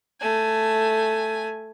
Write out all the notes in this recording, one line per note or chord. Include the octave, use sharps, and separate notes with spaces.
A3 G#5